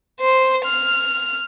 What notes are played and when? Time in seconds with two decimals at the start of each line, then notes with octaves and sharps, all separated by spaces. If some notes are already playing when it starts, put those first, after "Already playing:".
0.20 C5
0.66 F6